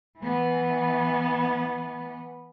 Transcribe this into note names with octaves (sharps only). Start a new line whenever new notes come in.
E3 B3